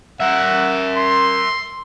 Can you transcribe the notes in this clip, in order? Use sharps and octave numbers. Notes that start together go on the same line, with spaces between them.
A#4 E5 F#5
C6